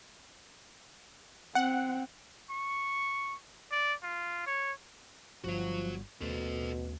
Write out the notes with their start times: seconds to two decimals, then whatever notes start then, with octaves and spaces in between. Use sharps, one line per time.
1.55 C4 F#5
2.50 C#6
3.71 D5
4.03 F4
4.46 C#5
5.44 G1 G2 F3 F#4 C#5
6.21 D#2 B2 A3 C#4 A4 C5